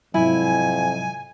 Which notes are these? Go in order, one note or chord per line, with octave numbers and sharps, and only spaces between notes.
F2 G#2 C3 F#3 E4 G#5